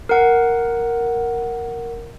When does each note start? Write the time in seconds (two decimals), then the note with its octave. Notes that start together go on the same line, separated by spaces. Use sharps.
0.09 A#4 F#5